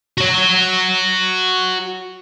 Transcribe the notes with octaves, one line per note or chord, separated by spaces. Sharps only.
F#4 C#5